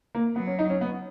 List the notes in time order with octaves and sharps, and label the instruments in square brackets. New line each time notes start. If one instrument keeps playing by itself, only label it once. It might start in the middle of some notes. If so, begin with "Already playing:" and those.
[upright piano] A#3
[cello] F#3 [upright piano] B3
[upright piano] C#4
D#4
C#4
B3